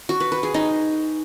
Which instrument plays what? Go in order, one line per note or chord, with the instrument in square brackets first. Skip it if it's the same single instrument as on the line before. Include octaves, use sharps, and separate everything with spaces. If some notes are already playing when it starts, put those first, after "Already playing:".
[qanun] F#4
B4
B4
G#4
D#4